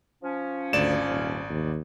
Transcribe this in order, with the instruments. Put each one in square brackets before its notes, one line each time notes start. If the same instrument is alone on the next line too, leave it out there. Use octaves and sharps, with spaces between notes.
[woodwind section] F3 C#4
[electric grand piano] G#1 D5 E7 [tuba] D2
[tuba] D#1
D#2